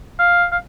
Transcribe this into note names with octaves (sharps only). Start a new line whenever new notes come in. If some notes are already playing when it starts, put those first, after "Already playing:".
F5
F5